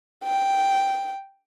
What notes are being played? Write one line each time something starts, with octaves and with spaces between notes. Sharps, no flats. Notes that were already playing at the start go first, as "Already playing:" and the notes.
G5